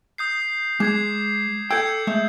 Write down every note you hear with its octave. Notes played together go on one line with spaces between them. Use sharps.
D#6 G6 C7
G#3 D6 G#6 C7
A4 G5 E6 G6 G#6
G#3 A3 E5